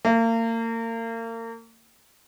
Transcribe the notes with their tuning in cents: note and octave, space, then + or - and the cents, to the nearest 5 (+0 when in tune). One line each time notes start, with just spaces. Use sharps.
A#3 -35